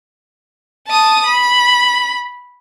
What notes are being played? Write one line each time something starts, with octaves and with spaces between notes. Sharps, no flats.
A5 D#6
B5